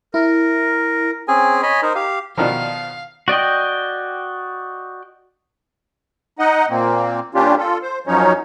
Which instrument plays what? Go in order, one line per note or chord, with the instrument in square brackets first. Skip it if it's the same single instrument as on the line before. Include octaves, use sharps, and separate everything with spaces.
[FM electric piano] E4 [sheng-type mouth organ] A#4
[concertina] C4 C#4 G#4 G#5
C#5 D#5 G#5 B5
D#4 A#4 C5
G4 F5
[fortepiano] B2 D#3 F3 [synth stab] D5 A#5 [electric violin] F5
[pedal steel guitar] F#4 D5 D#5 G5
[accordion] D#4 D#5 F#5
A#2 A#3 C4
A#2 G3 C#4 D4 F4 G4
F4 A4
C5
F#2 F3 F#3 C#4 D#4 C#5